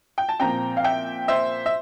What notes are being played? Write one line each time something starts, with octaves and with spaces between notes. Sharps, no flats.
G5
A5
A#2 F3 C4 G5 A#5
F5
E5 G5
C5 E5
E5